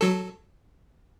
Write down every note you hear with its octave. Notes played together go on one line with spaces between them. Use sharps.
F#3 A4